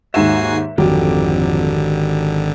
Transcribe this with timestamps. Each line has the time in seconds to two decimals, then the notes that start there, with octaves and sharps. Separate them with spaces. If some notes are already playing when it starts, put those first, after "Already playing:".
0.14 D#2 G#2 F#4 E5 G#5 C7 E7
0.78 G#1 F2 D3 D#3 F#3 G4